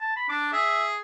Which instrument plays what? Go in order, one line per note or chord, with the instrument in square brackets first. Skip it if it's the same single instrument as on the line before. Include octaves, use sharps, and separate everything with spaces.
[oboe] A5
B5
[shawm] D4 [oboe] D6
[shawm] G#4 [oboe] E5